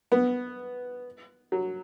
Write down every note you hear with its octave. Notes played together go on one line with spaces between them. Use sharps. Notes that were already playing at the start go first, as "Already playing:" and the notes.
B3
F#3